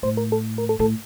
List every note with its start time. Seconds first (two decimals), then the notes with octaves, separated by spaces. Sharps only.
0.03 A2 C5
0.17 A#4
0.32 A4
0.58 A#4
0.69 A4
0.79 A2 A4